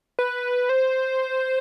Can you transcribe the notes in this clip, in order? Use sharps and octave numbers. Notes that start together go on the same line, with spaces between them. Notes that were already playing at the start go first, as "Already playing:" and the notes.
B4
C5